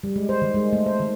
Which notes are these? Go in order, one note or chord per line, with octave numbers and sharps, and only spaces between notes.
G3
G#3
C5
D#3
G#3
A3
C5
D#3